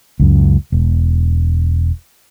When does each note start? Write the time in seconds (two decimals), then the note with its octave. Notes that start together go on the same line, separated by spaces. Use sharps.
0.20 C#2 F#2
0.72 E1